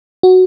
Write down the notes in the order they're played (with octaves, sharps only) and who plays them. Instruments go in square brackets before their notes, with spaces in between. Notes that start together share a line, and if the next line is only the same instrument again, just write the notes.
[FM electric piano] F#4